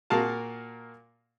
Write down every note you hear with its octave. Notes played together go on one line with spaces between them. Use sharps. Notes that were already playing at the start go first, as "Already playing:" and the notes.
A#2 F#4 A#4 F5 A5